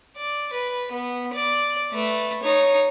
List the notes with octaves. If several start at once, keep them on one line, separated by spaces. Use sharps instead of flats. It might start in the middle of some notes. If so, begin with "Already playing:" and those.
D5
B4
B3
D5
A3 B4
D#4 C#5